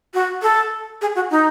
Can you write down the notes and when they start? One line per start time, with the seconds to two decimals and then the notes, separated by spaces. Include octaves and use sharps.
0.14 F#4
0.42 A4
1.02 G#4
1.16 F#4
1.31 D#4